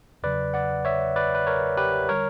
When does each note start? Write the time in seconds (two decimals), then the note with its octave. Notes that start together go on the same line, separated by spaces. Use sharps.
0.23 E2 C#3 F#3 B4 D5
0.54 D5 F#5
0.85 C#5 E5
1.16 B4 D5
1.35 B4
1.47 A#4 C#5
1.77 G4 B4
2.09 D3 G3 A#4 C#5